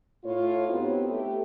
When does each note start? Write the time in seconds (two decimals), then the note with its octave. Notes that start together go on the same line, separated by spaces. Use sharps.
0.24 A2 F4 C#5
0.68 B3 C4 D#4 F#4 G4 C5
1.08 A3 G4